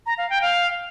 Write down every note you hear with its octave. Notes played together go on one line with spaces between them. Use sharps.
A#5
F5
G5
F5